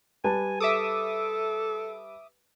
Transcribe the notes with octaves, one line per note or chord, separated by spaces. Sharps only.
G3 B4 G#5 A5
A4 E5 D6 D#6